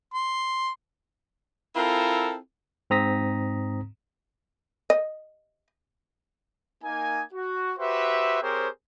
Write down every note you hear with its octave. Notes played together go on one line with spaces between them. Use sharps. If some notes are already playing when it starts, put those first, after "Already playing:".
C6
C4 E4 F4 A4 A#4
G#2 C4 A#5 D#6 A#6 B6
D#5
A#3 D#4 G#5
F#4
F#4 G4 B4 C5 E5
C4 G4 G#4 A#4 C5 C#5